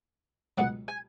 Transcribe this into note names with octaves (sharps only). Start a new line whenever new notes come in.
C#2 B2 F#3 F#5
G#5